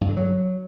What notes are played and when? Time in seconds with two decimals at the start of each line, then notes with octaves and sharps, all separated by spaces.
0.01 G2
0.09 D3
0.17 F#3